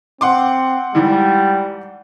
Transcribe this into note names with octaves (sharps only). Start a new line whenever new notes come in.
C4 F#5 C6 D6
G#2 E3 G3